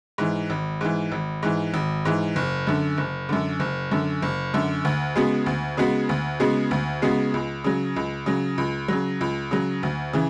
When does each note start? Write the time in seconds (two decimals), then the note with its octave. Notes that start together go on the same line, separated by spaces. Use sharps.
0.18 G#2 E3
0.50 G#1
0.81 G#2 E3
1.12 G#1
1.43 G#2 E3
1.74 G#1
2.05 G#2 E3
2.36 F#1
2.67 F#2 D3
2.98 F#1
3.29 F#2 D3
3.60 F#1
3.91 F#2 D3
4.22 F#1
4.54 F#2 D3
4.85 D2
5.15 C#3 G#3 B3 F#4
5.46 D2
5.77 C#3 G#3 B3 F#4
6.09 D2
6.40 C#3 G#3 B3 F#4
6.71 D2
7.02 C#3 G#3 B3 F#4
7.34 C#2
7.64 C#3 F#3
7.96 C#2
8.26 C#3 F#3
8.58 C#2
8.88 C#3 F#3
9.21 C#2
9.51 C#3 F#3
9.83 D2
10.13 C#3 E3